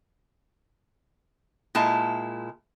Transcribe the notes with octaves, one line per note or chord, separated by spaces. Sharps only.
A#2 G#3 E4 A5